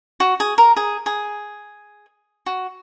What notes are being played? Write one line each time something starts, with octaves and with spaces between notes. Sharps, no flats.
F#4
G#4
A#4
G#4
G#4
F#4